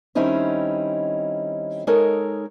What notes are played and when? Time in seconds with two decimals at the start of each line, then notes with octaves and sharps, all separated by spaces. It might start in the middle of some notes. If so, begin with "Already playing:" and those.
0.15 D#3 G3 C4 C#4 D#4 E4
1.87 G#3 D#4 A4 A#4 C#5